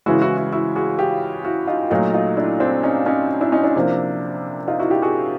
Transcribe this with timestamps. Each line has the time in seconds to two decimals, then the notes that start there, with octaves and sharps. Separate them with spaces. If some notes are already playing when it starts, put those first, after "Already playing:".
0.06 C#3 E3 G#3 E4 F#4
0.22 E4 F#4
0.37 E4 F#4
0.52 E4 F#4
0.76 F#4 G#4
0.99 F4 G4
1.45 E4 F#4
1.67 D#4 F4
1.90 A#2 F#3 A3 D#4 F4
2.14 D#4 F4
2.37 D4 E4
2.60 C4 D4
2.83 C#4 D#4
3.06 C#4 D#4
3.41 D4 E4
3.52 C#4 D#4
3.64 D4 E4
3.76 C3 F3 A#3
4.68 D#4 F4
4.79 E4 F#4
4.91 F4 G4
5.02 F#4 G#4